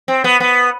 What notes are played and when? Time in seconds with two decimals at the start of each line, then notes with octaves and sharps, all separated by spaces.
0.08 C4
0.24 B3
0.40 B3